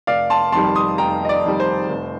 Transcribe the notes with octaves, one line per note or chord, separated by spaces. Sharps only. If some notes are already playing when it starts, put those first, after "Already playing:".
F1 D5 F5
A5 C6
F2 D#3 G3 A5 C6
C6 D#6
F1 G5 A#5
D#5
D5
F2 D#3 G3
C5
F1